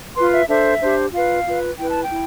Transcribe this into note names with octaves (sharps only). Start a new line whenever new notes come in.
F4 B4 C6
E5
D4 A4 C5 E5
D4 G4 C5
F4 B4 F5
F4 B4
E4 B4 G5
A5
G5
E4